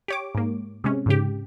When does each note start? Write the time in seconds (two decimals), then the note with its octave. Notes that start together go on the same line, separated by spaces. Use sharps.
0.08 G4 C#5 D6
0.35 G#2 A#3
0.84 C3 G#3 C#4
1.06 G#2 C#3 G4